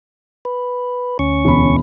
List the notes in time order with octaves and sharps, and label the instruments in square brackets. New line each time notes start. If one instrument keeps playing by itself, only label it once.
[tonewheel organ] B4
D2 C#4 C#6
[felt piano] E1 B5